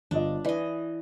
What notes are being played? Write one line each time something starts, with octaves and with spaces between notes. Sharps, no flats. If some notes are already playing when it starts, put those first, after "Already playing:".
G1 D4 F4 D#5
E3 B4 D5 D#5